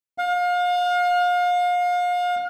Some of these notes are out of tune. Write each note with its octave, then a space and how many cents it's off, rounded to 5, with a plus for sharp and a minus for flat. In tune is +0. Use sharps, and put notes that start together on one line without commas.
F5 +35